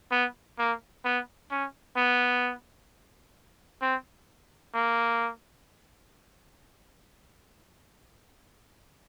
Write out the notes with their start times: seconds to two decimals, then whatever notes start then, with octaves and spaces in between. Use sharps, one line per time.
0.11 B3
0.59 A#3
1.05 B3
1.51 C#4
1.97 B3
3.82 C4
4.75 A#3